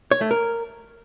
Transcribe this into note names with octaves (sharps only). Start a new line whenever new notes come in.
C#5
A3
A#4